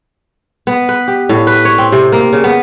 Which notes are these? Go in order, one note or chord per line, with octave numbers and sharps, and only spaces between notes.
B3
B4
G4
A2
B4
C#5
C4
C3
A#3
C#3
B3